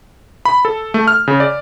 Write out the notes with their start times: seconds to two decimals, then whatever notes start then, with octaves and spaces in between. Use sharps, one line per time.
0.45 B5
0.65 A4
0.94 A3
1.08 F6
1.28 C#3
1.40 D5